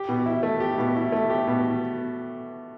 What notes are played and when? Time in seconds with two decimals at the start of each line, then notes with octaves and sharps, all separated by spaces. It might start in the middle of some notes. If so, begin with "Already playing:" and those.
Already playing: G4
0.09 B2
0.26 E4
0.43 A3
0.60 G4
0.78 B2
0.96 E4
1.12 A3
1.30 G4
1.47 B2